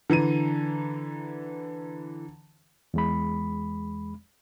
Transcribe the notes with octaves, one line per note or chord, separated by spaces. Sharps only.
D3 E3 A#5 D#7
E2 G#3 B5